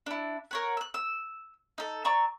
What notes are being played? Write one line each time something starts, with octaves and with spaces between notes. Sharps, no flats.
D4 E4
A#4 C#5 F#5
E6 F#6
E6
D#4 A4
D5 A#5 C#6 E6